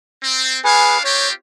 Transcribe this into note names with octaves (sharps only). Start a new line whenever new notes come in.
C4
D4 G#4 B4 C#5 F5 G#5
C4 F4 G4 C#5